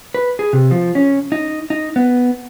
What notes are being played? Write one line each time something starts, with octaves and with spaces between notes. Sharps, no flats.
B4
G#4
C3
F3
C#4
D#4
D#4
B3